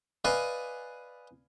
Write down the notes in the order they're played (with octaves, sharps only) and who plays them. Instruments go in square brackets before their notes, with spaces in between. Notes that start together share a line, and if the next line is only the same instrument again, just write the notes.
[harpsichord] B4 D5 D#5 F5 G#5